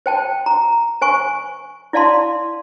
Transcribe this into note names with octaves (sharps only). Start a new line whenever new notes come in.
C5 G5 A5
A#5
C5 G#5 C#6
E4 D5 F5 A5 C6